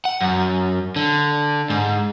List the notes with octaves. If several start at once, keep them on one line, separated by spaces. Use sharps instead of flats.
F#5
F#2
D3
G#2